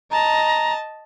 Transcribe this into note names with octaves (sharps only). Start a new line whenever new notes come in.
D#5 A5 A#5